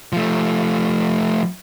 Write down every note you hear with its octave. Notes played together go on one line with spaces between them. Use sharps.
F3 A3